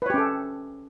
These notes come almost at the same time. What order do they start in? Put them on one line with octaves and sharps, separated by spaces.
B4 C#5 G4 C#4 A4